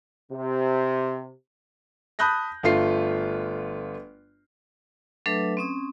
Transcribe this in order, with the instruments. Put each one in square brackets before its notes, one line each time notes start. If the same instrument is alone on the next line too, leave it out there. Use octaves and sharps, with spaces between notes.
[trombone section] C3
[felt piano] A5 B5 D#6 F#6 G6 A#6
G1 A3 F4 C7
[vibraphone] F#3 A3 D4 A4 B4 E5
C4 C#4 D#6